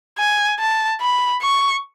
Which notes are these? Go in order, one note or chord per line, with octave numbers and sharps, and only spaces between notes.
G#5
A5
B5
C#6